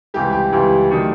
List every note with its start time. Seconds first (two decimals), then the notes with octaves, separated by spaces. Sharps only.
0.14 C#2 C3 E3 G3 G4
0.33 G4
0.52 C#2 C3 E3 G3
0.91 D#3 F#3 A3 D4